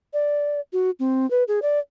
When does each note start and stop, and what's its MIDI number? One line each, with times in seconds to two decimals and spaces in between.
0.13 0.60 74
0.73 0.90 66
1.00 1.28 60
1.30 1.44 71
1.48 1.59 68
1.62 1.79 74